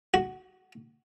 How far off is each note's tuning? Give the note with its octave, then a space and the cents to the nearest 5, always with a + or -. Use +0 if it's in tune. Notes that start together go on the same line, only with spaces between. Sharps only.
F#4 +10